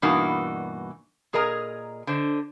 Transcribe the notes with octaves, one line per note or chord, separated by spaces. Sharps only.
G2 B2 E3 A#3 D#4 F#4
A#2 G#4 A#4 D#5 A#5
D3 C5 D#5